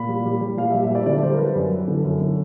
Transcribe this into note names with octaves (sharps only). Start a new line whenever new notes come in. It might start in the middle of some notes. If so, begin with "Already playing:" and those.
Already playing: A#2 B5
G3
G3
G3
A#2 F5
E5
G3
E5
G3
D5
D3 D5
G3 C5
A#4
G3 B4
F#2
F#2
D3
F#2
D3